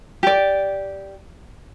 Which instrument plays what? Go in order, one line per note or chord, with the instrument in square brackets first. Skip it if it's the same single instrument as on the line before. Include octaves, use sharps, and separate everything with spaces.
[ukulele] G4 D5